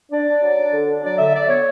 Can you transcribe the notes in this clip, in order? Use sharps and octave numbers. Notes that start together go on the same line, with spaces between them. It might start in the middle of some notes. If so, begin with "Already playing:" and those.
D4 D5
D4
F#3
D4
D3
D4
F#3 D5
D3 E5
D3 D5
B3 C#5